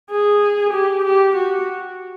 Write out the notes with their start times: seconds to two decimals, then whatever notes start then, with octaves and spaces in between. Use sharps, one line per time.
0.11 G#4
0.73 G4
1.04 G4
1.36 F#4